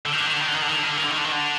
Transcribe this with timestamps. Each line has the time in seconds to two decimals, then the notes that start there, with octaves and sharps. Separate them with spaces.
0.05 D3
0.13 D#3
0.20 D3
0.26 D#3
0.33 D3
0.41 D#3
0.48 D3
0.54 D#3
0.62 D3
0.68 D#3
0.76 D3
0.83 D#3
0.89 D3
0.97 D#3
1.04 D3
1.10 D#3
1.18 D3
1.25 D#3
1.32 D3